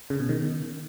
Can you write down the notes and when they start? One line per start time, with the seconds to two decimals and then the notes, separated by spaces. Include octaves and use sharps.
0.10 C#3
0.20 B2
0.29 D#3